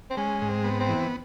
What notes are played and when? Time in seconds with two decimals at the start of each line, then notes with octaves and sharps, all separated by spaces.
0.10 C4
0.17 G#3 C#4
0.42 G#2
0.49 C4
0.64 B3
0.80 C4
0.89 E3